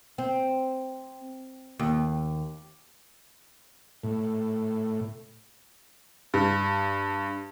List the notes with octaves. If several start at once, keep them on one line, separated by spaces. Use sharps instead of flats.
C4
D#2
A2
G2